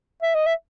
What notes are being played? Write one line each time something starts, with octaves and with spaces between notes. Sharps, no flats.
E5
D#5
E5